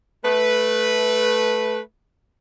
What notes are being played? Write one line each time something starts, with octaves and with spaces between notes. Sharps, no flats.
A3 B4